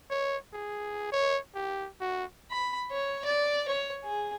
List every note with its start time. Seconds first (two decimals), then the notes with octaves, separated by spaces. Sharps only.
0.11 C#5
0.53 G#4
1.12 C#5
1.55 G4
2.01 F#4
2.51 B5
2.91 C#5
3.24 D5
3.68 C#5
4.04 G#4